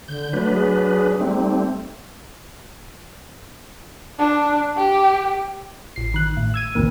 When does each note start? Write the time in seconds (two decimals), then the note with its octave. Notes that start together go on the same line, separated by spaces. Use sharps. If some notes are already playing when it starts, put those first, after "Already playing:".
0.08 D3 G6
0.33 F#3 A3 D4 B4
0.54 G#4
1.20 G3 A3 C4 D#4
4.19 D4
4.77 G4
5.96 A1 C7
6.14 D#3 F#6
6.37 A2
6.54 E6 G#6 D#7
6.75 A#1 E2 C3 D#3 A#3